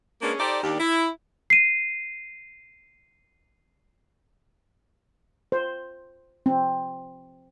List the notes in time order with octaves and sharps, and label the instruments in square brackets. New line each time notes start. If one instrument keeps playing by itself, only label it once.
[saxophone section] G#3 A#3 B3 C#4 D4 G#4
D#4 G4 A4 C5 D5
D#2 D4 G4
E4
[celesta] C7 D#7
[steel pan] C5
C4